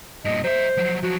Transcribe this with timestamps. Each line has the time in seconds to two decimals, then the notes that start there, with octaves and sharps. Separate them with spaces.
0.25 G2 A#2 D#5
0.44 F#3 C5 E5
0.77 F3 F#3
1.03 F3 F#3 F#4